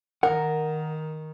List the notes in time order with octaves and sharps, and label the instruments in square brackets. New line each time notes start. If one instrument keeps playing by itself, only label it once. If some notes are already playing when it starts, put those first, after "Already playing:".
[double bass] D#3 [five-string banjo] A#4 [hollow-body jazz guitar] F#5